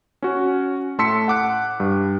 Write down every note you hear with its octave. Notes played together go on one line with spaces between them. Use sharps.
C#4 F#4
A2 A5 C6 E6 B6 C#7
F#5 D6 F#6
G2